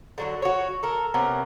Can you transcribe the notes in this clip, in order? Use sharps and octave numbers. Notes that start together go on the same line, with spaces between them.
D3 F#3 F#4
F#4 C#5
A4 A#4
C3 B3 C#4 A#4